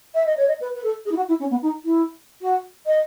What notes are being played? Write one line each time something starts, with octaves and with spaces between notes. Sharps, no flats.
E5
D#5
C#5
D#5
B4
B4
A4
G#4
E4
F#4
E4
C#4
B3
D#4
E4
F#4
D#5